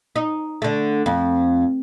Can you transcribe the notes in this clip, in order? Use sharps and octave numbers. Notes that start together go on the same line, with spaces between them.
D#4
D3 A3
F2